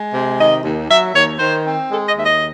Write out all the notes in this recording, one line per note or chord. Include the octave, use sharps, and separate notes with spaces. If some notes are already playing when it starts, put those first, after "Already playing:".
Already playing: G#3
C3
D#3 D#5
D#2
F#3 E5
D#2 C#5
D#3 C5
C4
G#3 A4
D#5
D#2 E5
D#5